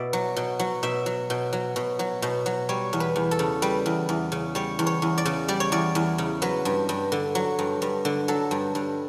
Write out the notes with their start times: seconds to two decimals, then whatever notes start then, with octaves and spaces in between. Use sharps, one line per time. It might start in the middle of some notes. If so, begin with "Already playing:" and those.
Already playing: B2 D5 E5
0.13 F#3
0.36 B2
0.59 F#3
0.83 B2 E5
1.06 F#3
1.30 B2
1.53 F#3
1.76 B2
1.99 F#3
2.22 B2
2.46 F#3
2.69 G3 C#5
2.93 E2
3.00 B4
3.16 E2
3.31 A4
3.39 C#3
3.62 G3 B4
3.86 E2
4.09 E2
4.32 C#3
4.55 G3 C#5
4.79 E2
4.87 C#5
5.02 E2
5.18 D5
5.25 C#3
5.48 G3 D5
5.60 C#5
5.72 E2 D5
5.95 E2
6.18 C#3
6.42 F#3 B4
6.65 G2
6.89 G2
7.12 D3
7.35 F#3
7.59 G2
7.82 G2
8.05 D3
8.28 F#3 A4
8.51 G2
8.75 G2